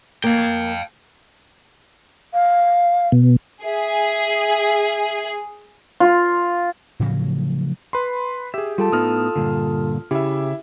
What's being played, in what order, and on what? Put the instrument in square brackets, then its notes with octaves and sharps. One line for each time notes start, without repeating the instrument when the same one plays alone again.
[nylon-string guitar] A#3 [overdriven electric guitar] F5 G5
[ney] F5
[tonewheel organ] B2
[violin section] G#4 [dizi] E5
[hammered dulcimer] F4
[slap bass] A2 C#3 F3 F#3
[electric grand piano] B4 B5 C6
[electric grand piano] G4 G#4 [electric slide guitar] E5
[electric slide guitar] G3 [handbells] F4 A4 A5
[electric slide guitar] A2 B3 D#4 [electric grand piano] D#6 F6
[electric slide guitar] G2 A#2 D3
[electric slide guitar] C#3 [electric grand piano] E4 E5 [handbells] G4